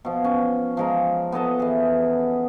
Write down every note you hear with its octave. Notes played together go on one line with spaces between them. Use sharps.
B2 F3
C#4
F3 G#3 A#5
B3 A4 D#5 A5
E3 G#4